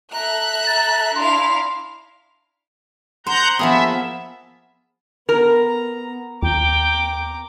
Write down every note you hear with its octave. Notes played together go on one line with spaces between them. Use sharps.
A4 E5 A#5 F#6
A6
D4 E4 F5 C6
C5 F#5 A#5 G6
F3 A#3 B3 G#4 E5 F#5 B5
B3 A#4 A#5
D#2 G5 A#5 D6